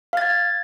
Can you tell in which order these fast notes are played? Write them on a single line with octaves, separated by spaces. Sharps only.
F5 A6 G#6